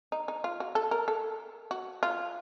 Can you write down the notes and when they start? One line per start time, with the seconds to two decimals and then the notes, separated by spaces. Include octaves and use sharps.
0.12 D#4
0.28 D#4
0.44 F4
0.60 F#4
0.75 A4
0.91 A#4
1.08 A4
1.71 F#4
2.03 F4